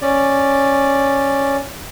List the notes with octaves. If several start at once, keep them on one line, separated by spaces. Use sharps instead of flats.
C#4 D5